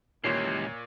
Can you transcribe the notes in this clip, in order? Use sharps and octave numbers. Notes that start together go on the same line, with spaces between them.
D#1 C#2 A#2 E3 G4 C#5 C6 C7